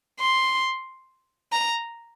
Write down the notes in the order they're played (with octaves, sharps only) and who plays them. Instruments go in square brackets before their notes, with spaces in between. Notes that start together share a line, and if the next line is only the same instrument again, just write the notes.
[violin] C6
A#5